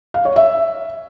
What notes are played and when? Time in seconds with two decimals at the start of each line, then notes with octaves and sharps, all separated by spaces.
0.14 F5
0.25 C#5
0.36 E5